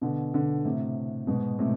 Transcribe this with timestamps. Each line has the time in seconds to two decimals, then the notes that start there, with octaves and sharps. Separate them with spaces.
0.01 B2 D3
0.34 B2 D3
0.65 A2 C3
1.27 G#2 B2
1.59 A2 C3